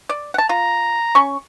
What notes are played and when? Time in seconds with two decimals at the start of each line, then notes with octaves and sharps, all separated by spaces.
0.09 D5
0.34 F#5 A5
0.49 F4 A#5
1.15 C#4 C#6